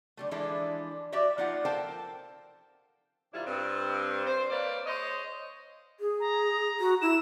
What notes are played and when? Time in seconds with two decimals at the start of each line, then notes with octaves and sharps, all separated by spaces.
0.17 D3 G3 A3
0.31 E3 F3 G#3 D4 E4 A4
1.12 F#4 G4 D5 E5
1.38 F3 A#3 D#4 F4 E5 F#5
1.65 A4 A#4 C5 F5 G5 A5
3.34 C3 D#3 G3 D4 E4 F4
3.46 G2 C4
4.27 C5
4.50 A#3 B4 C#5 D5
4.85 G#4 C5 C#5 D#5
6.00 G#4
6.20 A#5
6.80 F#4
7.02 E4 E7